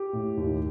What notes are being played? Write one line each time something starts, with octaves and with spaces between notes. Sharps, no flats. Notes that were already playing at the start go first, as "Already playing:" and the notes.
Already playing: G4
A2
D#2